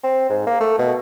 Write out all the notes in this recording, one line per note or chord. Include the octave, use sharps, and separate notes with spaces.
C4
G#2
A#3
A3
B2